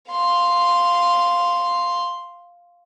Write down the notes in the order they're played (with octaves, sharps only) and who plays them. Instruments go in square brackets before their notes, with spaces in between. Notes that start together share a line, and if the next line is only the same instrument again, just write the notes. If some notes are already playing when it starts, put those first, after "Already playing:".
[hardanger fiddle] F5 C6